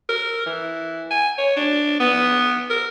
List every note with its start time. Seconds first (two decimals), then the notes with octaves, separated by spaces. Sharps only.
0.09 A#4
0.46 E3
1.11 G#5
1.38 C#5
1.56 D4
2.00 B3
2.70 A#4